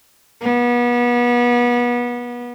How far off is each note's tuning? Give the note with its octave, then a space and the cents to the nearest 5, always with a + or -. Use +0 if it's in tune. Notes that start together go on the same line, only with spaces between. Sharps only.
B3 -30